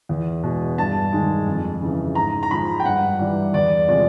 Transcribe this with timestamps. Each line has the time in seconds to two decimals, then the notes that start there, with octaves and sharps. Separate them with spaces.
0.09 E2
0.43 B2 G#3
0.78 G2 A5
1.12 D#3 G#3
1.47 F2
1.81 C#3 E3
2.15 G#2 A#5
2.43 A#5
2.51 F3 G#3 B5
2.80 G5
2.85 G2 F#5
3.19 E3 G3
3.54 E2 D5
3.88 C3 F3 G#3 D5